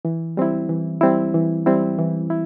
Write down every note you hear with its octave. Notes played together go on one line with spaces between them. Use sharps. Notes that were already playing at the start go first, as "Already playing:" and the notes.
E3
G3 C4 E4
E3
G3 C4 E4
E3
G3 C4 E4
E3
E4